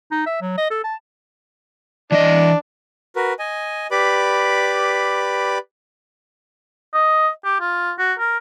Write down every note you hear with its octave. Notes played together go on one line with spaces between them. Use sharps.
D#4
E5
F#3
D#5
A4
A5
E3 D4 D#5
F#4 A#4 B4
D#5 G#5
G4 B4 D5 B5 D6
D#5
G4
F4
F#4
A#4